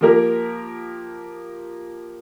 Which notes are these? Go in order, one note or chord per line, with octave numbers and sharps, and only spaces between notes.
F3 A#3 G4 A#4